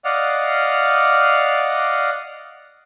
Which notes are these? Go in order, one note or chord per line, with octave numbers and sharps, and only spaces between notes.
D5 D#5 F5 F#5 F6